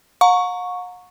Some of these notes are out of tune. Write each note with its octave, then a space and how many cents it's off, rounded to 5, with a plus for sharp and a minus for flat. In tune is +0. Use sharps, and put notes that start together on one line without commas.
F#5 -45 A#5 -15 C#6 +0